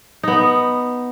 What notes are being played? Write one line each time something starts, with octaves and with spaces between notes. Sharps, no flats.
B3 D#4